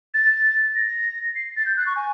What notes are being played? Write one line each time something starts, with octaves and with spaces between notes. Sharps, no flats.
A6
A#6
C7
A6
G6
F#6
C#6
G#5